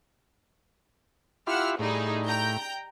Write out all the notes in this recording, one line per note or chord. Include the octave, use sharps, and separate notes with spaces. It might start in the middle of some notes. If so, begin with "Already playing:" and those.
E4 F4 G4 F#5 E6 F6
A2 G3 D#4 G#4
G5 A#5 G6